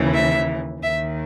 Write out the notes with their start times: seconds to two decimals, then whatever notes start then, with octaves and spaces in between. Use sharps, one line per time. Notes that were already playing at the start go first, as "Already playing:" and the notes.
Already playing: D#2 C#3 E3
0.14 E5
0.82 D#2 D#3 E5